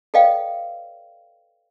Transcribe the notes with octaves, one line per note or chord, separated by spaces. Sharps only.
A4 B4 D5 D#5 F5 G5